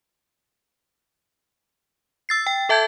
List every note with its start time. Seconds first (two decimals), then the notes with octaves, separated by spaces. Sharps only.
2.29 E6 A6 C7
2.47 G5
2.69 A4 E5 A5 G6 G#6